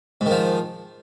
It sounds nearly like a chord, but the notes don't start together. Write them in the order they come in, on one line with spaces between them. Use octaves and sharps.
G#2 D#3 F3